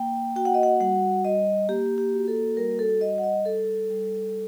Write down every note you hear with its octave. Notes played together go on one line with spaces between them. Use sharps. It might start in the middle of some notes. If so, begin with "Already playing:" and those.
Already playing: A#3 G5
F#4 G5
F#5
D#5
F#5
G3 F#5
G3 D#5
A#3 G4
G4
F#4
A4
G3 A#4
A4
G3 D#5
F#5
D#5
G3 A4
G3